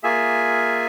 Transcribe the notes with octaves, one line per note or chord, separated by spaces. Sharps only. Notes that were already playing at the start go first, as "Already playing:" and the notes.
A#3 F4 G#4 E5 G#5